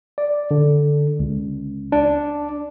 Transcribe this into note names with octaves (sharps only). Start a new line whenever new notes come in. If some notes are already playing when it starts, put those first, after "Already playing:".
D5
D3
C#2
D4